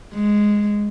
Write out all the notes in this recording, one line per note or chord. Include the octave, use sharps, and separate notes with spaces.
G#3